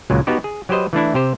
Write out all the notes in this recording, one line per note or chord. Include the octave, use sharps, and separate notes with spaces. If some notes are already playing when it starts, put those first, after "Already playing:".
C#2 A#2 F#3 G#3
B3 D#4 F#4 G4
G#4
F#3 G4 B4 C5 D#5
E3 A3 D4 E4
C3 G4 C5